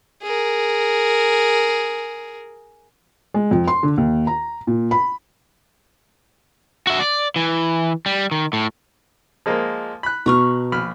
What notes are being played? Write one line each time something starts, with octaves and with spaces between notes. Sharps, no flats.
G#4 A#4
G#3
F2
C6
D3
D#2
A#5
A#2
B5
F#4 E5
D5
E3
G3
D#3
A2
F3 G#3 A#3
B5 F#6
B2 A#5 C#6 F6
A#1 B5 F6